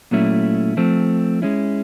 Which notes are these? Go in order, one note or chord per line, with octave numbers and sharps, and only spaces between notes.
A#2 F#3 A3 C#4 E4
F3 A3 C4
G#3 C#4 E4